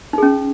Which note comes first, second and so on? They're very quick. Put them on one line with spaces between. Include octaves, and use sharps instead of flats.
D#4 G#4 C#4